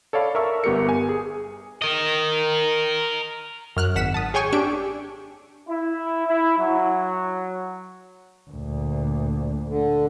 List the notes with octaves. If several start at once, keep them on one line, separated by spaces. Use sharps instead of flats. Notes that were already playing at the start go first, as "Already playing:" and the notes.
A4 C#5 D5 F5 B5
A#4 E5 A5 C#6 E6
G1 B3 G4 A#4 C#7
G#5
G#4
A#4 D#5
F#2 F6 F#6
G#1 F#5 B6 E7
A5 D#6
G#4 C#5 G5 G#5 C#6
D4 G4 C#6 E6 D7
E4
E4
F#3
D2 A#2
D3